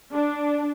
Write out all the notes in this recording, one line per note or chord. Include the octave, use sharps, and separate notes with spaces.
D4